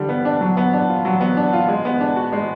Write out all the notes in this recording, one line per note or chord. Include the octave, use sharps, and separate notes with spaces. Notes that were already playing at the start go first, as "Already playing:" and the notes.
Already playing: D3 G3 D4
B3
D4
F#3
B3
D4
F4
F#3
B3
D4
F4
G#3
B3
D4
F#4
G#3